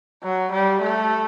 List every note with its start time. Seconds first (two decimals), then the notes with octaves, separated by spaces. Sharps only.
0.23 F#3
0.52 G3
0.81 A3